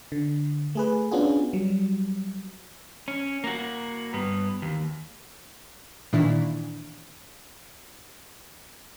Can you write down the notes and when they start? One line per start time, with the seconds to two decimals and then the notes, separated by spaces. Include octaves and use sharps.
0.12 D3
0.75 A3 G#4 B4
1.11 B3 C#4 D4 F4 F#4 G#4
1.53 F#3 G3
3.08 C#4
3.44 A#3 F#4
4.13 G2 B3
4.62 D#2
6.13 A#2 D#3 E3 D4 E4